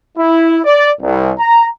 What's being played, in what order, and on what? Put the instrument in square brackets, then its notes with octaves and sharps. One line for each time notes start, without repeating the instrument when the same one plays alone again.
[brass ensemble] E4
D5
C2
A#5